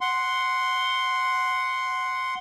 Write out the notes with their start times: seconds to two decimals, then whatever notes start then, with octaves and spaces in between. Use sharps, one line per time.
0.01 F#5 C6